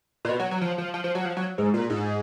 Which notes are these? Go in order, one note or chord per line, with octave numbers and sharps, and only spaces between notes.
A#2
B2
F#3
F#3
F3
F3
F3
F3
F#3
F3
F#3
G#2
A#2
G#2